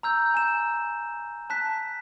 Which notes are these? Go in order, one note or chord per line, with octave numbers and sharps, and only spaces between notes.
A#5 E6 G6
G#5 E7
A5 F#6 B6